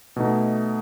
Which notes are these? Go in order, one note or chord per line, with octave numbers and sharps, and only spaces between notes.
B2 A3 D#4